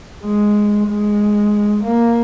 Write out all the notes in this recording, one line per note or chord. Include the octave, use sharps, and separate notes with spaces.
G#3
G#3
A#3